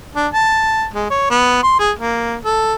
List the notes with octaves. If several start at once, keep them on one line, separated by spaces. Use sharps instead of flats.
D4
A5
G#3
C#5
B3
C6
G#4
A#3
A4